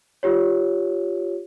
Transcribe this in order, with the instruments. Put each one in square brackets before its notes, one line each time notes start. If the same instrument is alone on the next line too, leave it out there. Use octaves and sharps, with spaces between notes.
[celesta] F4 G4 C#5